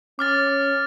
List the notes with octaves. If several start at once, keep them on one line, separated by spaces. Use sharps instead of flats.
C#4 D6 F6 A6